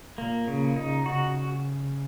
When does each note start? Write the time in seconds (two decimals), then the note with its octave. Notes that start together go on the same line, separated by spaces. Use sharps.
0.18 A#2 A#3
0.48 C#3
0.76 D#4
1.05 C#3 F#4